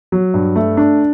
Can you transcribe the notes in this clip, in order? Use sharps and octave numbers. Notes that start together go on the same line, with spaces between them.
F#3
G2
A3
D4